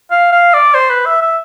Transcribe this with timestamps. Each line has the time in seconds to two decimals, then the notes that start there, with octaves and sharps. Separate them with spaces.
0.11 F5
0.32 F5
0.54 D5
0.75 C5
0.90 B4
1.06 E5
1.22 E5